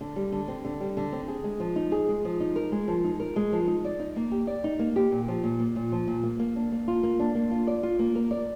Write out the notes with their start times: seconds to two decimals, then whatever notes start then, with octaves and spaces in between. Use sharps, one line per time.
0.01 D3
0.16 G3
0.32 D3
0.48 C4
0.65 D3
0.81 G3
0.97 D3
1.12 C4
1.28 G#4
1.44 G#3
1.60 F3
1.76 D#4
1.92 G#4
2.09 G#3
2.25 F3
2.40 D#4
2.56 A#4
2.72 G#3
2.88 F3
3.04 D#4
3.20 A#4
3.36 G#3
3.52 F3
3.67 D#4
3.85 D5
4.00 D#4
4.16 A#3
4.31 G4
4.47 D5
4.64 D#4
4.79 A#3
4.96 G4
5.12 A#2
5.28 F3
5.44 A#2
5.60 A#3
5.76 A#2
5.92 F3
6.08 A#2
6.23 A#3
6.39 A#3
6.56 D4
6.72 A#3
6.88 F4
7.03 A#3
7.19 D4
7.35 A#3
7.51 F4
7.67 D5
7.83 F4
7.99 A#3
8.15 A#4
8.31 D5